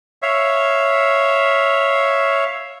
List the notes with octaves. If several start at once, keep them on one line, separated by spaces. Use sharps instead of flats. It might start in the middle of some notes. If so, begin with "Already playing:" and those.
C#5 E5 F5